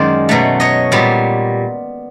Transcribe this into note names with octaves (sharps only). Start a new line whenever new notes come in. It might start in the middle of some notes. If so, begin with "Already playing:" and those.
Already playing: F#2 D#3 G#3 C5 D5
B2 F#3 A3
C#5 D#5
A#2 G3 B3